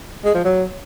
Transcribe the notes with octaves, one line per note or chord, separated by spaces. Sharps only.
G#3
F3
F#3